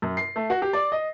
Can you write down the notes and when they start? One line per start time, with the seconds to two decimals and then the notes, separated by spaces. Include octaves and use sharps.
0.02 F#2
0.17 C7
0.36 A3
0.50 F#4
0.62 G4
0.73 D5
0.92 D#5